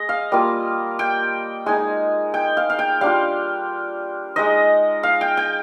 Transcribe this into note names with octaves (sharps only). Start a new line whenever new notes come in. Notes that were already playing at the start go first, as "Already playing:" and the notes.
Already playing: G#3 D#5
F5
G3 A#3 F4
G5
G#3 D#4 G#5
G5
F5
F5
G5
G3 D4 F4 F5
G#3 D#4 D#5
F5
G5
G5